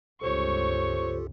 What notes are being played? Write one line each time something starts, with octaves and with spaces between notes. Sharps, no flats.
G1 C#2 F4 G4 A4 C5 C#5 C#6